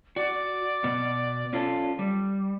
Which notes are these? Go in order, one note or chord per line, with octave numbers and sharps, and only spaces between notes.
F#4 D5
B2 B3
C#4 F4 A4
G3